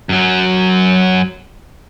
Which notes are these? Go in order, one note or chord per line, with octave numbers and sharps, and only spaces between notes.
F#2 F#3